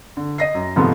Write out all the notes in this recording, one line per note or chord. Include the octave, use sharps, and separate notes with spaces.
D3
D#5 A#6 C7
F#2
G#2 C3 F3 A3 B3